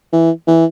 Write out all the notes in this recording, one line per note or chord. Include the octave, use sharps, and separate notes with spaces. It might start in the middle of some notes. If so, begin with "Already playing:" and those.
E3
E3